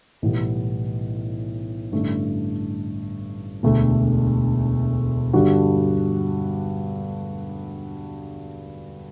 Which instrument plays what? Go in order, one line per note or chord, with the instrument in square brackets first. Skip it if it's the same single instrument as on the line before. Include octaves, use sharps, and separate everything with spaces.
[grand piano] B1 A2 E3 G3 B3
A1 G2 D3 A3 D4
E1 D2 D3 A3
G2 D3 G3 D4 F#4